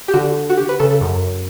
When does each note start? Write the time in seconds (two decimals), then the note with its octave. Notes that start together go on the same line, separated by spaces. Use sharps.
0.08 G4
0.14 D3 F#4
0.50 F#4
0.57 G4
0.69 B4
0.80 C#3 A4
0.90 A4
1.01 F#2